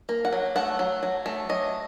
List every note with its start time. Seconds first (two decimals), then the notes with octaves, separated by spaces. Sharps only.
0.09 A#3
0.25 F#5
0.33 F#3
0.56 A3 F#5
0.79 F#3
1.03 F#3
1.26 A3
1.49 F#3 D#5